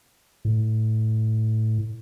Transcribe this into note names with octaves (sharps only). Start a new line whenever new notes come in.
A2